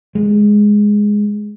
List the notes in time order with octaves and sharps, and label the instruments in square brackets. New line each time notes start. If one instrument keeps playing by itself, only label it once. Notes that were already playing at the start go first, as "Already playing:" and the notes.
[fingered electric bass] G#3